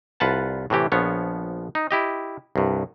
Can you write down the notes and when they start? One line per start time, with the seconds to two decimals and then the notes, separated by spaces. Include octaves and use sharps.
0.20 C2 F4 B4 F#5 A5
0.70 A2 C3 E3 G4
0.92 A#1 F3 B3 C#5
1.75 D#4
1.91 E4 G4 D#5
2.56 C2 G2